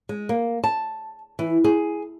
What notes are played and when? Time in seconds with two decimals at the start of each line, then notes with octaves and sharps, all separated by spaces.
0.09 G#3
0.29 A#3
0.64 A5
1.39 E3
1.64 G#4